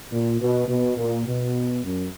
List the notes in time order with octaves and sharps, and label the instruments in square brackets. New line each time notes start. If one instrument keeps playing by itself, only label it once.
[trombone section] A#2
B2
B2
A#2
B2
F#2